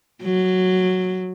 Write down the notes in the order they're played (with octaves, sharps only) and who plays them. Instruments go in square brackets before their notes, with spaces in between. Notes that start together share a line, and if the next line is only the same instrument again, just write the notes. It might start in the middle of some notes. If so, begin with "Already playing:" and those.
[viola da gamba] F#3